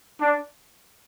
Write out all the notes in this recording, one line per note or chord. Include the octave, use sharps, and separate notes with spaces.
D4